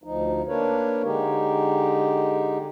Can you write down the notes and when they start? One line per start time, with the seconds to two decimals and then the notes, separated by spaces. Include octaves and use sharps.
0.04 D2 F3 D#4
0.48 A#3 D4 A#4 B4 C#5
1.03 D3 G#3 D#4 G4